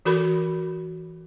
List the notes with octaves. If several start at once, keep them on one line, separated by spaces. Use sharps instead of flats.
E3 F#4 A4 A#4 B5